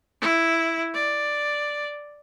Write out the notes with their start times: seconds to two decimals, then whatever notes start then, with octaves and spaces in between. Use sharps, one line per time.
0.22 E4
0.94 D5